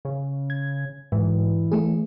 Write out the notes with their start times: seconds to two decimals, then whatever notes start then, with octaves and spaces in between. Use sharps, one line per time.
0.05 C#3
0.50 G#6
1.12 G#2 E3
1.72 A3 G#4